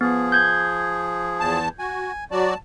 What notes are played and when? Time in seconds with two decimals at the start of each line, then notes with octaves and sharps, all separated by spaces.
0.01 F3 B3 G#4
0.32 G6 G#6
1.40 E2 A5
1.79 F#4 G#5
2.31 F#3 F#4 D5 A5